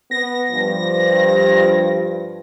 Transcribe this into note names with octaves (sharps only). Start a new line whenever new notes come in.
B3 A#6
G2 F3